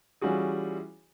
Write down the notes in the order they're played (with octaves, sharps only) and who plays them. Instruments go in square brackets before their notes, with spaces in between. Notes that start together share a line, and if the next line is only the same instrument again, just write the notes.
[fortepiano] E3 G3 C#4 F4 F#4 G#4